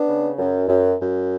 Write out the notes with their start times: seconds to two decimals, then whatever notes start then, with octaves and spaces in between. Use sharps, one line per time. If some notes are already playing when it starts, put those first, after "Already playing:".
Already playing: B3 D4
0.08 C#3
0.38 F#2
0.68 F#2
0.99 F#2